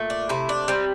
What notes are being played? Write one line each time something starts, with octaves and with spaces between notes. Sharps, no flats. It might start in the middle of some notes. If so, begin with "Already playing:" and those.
Already playing: A#2 A3
D4
C3 E4
D4
G3 C4